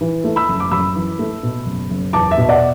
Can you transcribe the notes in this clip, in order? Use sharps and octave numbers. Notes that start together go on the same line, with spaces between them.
E3
A3
B5 E6
F#1
D6
F#2 B5 E6
E3
A3
B2
F#1
F#1
E2 A5 D6
E5
B2
D5 F#5